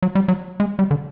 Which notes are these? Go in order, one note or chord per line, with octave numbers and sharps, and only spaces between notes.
F#3
G3
F#3
G#3
G3
D3